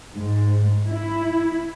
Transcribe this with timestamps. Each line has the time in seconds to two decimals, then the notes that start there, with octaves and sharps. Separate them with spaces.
0.16 G#2
0.89 E4